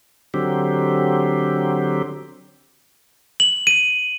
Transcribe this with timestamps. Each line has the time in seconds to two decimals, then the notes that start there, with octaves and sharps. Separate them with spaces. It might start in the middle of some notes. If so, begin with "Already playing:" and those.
0.34 D3 F#3 C4 G4
3.40 F#7
3.67 D#7